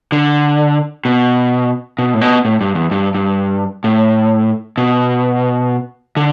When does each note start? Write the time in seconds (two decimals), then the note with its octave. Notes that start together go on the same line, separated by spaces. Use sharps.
0.12 D3
1.05 B2
1.99 B2
2.14 A2
2.21 B2
2.45 A2
2.61 G2
2.75 E2
2.91 G2
3.15 G2
3.84 A2
4.78 B2
6.17 D3